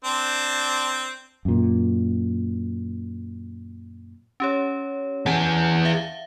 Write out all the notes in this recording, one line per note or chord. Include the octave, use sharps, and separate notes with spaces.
C4 D4
F#2 A#2
C#4 G4 C#5
E3 G#4 F#5 A5
E5 F5